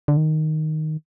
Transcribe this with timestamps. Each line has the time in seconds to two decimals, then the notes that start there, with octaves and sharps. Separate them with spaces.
0.08 D3
0.17 D#3